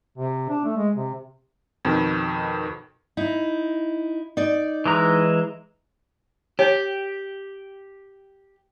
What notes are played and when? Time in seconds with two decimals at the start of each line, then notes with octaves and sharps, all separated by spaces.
0.18 C3
0.49 D4
0.65 A3
0.77 G#3
0.96 C3
1.85 F2 B2 D#3
3.17 D#4 E4
4.37 D#4 D5
4.86 E3 G#3 A#5
6.59 G4 C#5